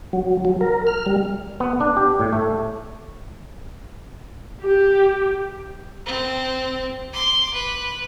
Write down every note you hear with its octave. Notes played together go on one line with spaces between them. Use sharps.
F#3
F#3
A#4
F6
G3
B3
D4
G4
A2
A3
G4
C4
C6 D6
B4